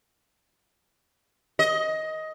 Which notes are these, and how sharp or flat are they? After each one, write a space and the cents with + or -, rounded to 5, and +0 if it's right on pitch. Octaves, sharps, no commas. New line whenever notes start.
D#5 +15